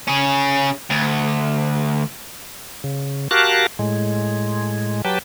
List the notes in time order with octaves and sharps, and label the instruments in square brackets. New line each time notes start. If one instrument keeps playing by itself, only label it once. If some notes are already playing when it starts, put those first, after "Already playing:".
[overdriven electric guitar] C#4 G#4
D2
[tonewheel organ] C#3
F#4 G4 A#4 F5 A5 F#6
A2 G#3
F#3 G4 B4 G5 A5